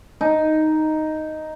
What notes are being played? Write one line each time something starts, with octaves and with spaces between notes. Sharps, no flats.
D#4